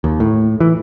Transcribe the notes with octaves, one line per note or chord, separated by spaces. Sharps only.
D#2
A2
E3